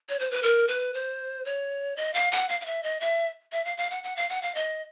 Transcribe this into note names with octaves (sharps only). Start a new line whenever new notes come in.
C#5
C5
B4
A#4
B4
C5
C#5
D#5
F5
F#5
F5
F5
E5
D#5
E5
E5
F5
F5
F#5
F#5
F5
F#5
F5
D#5